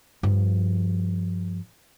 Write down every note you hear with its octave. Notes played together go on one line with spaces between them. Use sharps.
G2 F3